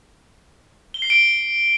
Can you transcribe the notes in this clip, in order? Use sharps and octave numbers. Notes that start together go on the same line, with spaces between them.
G7
C7
D7